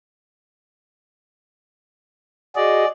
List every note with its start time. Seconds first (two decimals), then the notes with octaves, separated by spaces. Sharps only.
2.56 F#4 G#4 D5 D#5